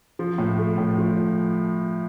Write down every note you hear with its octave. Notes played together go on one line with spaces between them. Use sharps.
F3
A2
A3
A2
F3